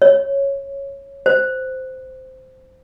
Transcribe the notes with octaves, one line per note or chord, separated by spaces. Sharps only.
C#5
C5